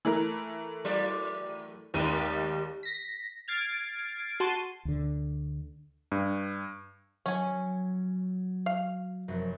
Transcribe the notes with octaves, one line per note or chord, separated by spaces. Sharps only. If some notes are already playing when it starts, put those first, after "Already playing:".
E3 A3 A#4
F#3 D5
D#2 G3 G#3 D#4 D#7
A#6 B6
F6 G#6 A6 C7 D7
F#4 A5 C6 D#7
D2 D3
G2
F#3 C#4 G#5
F5
F1 F#2